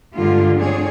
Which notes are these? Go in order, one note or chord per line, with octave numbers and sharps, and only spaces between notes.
G2 D3 G3 G#3 F4
C4 D4 G#4 C#5